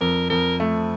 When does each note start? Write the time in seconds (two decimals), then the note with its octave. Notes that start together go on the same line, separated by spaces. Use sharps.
0.01 F2 A#4
0.30 F2 A#4
0.60 A3